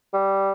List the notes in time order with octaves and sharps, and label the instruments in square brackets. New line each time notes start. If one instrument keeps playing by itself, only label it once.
[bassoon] G3